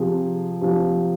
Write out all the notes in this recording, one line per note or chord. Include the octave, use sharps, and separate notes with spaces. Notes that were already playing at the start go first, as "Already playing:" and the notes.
Already playing: C3 F3 G#4
C3 F3